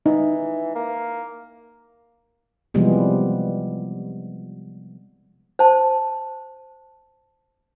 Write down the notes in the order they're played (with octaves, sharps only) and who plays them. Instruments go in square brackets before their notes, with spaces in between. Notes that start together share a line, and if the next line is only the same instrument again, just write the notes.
[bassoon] E3 [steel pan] D#4
[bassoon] A#3
[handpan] C3 E3 F3 G3 G#3 B3
[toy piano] C5 A5